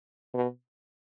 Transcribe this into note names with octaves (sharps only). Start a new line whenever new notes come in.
B2